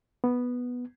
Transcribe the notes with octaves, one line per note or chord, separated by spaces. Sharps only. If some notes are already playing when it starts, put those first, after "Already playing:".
B3